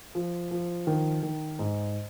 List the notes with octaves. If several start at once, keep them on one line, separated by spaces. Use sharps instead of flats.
F3
F3
D#3
D#3
G#2